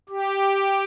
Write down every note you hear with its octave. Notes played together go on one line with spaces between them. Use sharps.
G4